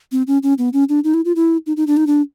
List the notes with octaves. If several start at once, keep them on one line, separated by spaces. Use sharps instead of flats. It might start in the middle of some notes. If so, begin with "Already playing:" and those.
C4
C#4
C#4
B3
C#4
D4
D#4
E4
F4
E4
D#4
D#4
D4
D#4
D4